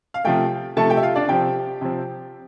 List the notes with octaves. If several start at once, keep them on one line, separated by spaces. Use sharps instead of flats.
F5
C3 F3 A3 G4 G5
C3 F3 A3 A4 A5
G4 G5
E5
F4 F5
D4 D5
C3 F3 C4 G4 G5
C3 F3 C4